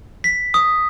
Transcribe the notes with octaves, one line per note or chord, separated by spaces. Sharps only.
B6
D#6